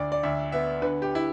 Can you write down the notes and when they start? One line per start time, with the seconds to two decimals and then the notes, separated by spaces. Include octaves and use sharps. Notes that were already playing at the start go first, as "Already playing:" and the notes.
Already playing: D2 D3 D5
0.12 D5
0.23 D2 E5
0.52 B3 E5
0.82 D3 B4
1.02 G4
1.15 E4